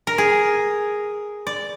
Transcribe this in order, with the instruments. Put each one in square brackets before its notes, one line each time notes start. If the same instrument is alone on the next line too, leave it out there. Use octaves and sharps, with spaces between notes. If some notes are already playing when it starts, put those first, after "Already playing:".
[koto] A#4
G#4
D5